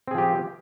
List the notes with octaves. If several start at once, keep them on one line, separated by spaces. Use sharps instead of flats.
F3 C4 G4 G#4